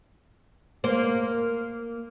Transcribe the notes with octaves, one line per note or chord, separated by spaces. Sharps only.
A#3 C5